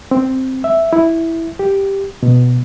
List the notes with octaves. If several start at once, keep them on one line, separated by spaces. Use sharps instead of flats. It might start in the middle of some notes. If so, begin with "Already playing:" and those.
C4
E5
E4
G4
B2